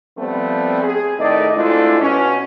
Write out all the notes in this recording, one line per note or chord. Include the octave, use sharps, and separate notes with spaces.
F3 G3 A3 B3 C4
G#4
A2 D#3 A3 D5 D#5
G#3 A3 C4 D4 E4 F4
B2 C#4